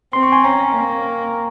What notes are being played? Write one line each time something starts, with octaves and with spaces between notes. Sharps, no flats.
C4 C6
C#6
G#5 C6
C#4 G5 A#5
A#3